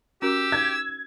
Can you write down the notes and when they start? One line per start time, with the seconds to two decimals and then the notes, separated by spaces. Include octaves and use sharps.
0.22 C#4 F#4 G4 A#4 E6
0.52 G#6